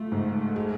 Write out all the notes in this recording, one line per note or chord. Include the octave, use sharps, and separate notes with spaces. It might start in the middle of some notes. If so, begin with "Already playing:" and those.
Already playing: A3 F4
G#2
G#3